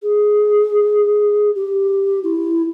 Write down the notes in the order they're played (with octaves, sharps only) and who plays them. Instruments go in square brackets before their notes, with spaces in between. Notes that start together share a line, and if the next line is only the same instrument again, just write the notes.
[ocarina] G#4
G4
E4